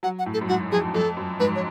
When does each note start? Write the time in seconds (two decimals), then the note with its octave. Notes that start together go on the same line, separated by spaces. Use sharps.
0.03 F#3 F#5
0.19 F#5
0.26 A2
0.34 A4
0.41 F#2
0.48 G#2 F#4
0.72 F2 G#4
0.94 F2 A4
1.17 F#2
1.40 G#2 B4
1.55 C#5